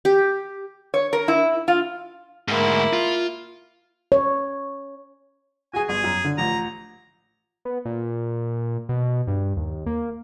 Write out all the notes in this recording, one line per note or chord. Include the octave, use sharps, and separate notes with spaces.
G4
C#5
A#4
E4
F4
D2 G#2 A#3 E4
F4
C#5
F#4 G#4 G#5
G1 G#4
F#2
D3
A1 F3 A#5
B3
A#2
B2
G2
D#2
A#3